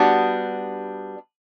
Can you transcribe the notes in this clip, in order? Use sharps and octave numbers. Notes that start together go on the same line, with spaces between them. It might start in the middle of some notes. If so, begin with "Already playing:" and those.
Already playing: G3 B3 D4 F#4